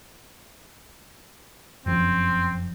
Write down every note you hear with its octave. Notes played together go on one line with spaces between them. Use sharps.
F1 F#2 F3 C4